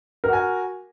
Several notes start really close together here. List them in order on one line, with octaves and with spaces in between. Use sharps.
A#4 F#4 G#5